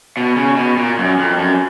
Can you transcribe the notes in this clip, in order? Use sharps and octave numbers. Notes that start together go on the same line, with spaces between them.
B2
C#3
B2
A#2
F#2
F2
F#2